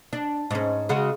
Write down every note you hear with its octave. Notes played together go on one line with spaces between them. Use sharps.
D4
G#2 C#4
C#3 G#3 F#4